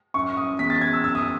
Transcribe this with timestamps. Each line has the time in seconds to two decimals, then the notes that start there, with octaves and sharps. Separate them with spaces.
0.14 F#2 C#6
0.37 F#2 D#6
0.59 E2 B6
0.70 A6
0.81 E2 G#6
0.93 E6
1.04 F#2 E6
1.15 D#6